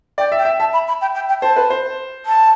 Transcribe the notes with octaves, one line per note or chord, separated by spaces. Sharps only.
D5 G5
E5
G5
E5
E5 A5
B5
B5
G5
G5
G5
C5 A5
B4
C5
A5